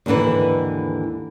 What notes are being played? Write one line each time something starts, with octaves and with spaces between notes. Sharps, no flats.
D#2 G#2 D3 E3 B4